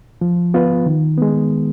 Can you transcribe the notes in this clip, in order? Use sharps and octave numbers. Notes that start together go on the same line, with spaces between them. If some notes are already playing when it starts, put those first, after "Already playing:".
F3
B3 F4 B4
D#3
G#3 B3